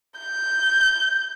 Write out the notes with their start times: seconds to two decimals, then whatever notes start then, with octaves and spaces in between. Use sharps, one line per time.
0.19 G6